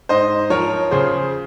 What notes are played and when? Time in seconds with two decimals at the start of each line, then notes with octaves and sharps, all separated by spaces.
0.09 G#2 C5 D#5
0.50 F3 A#4 C#5
0.91 C#3 G#4 C5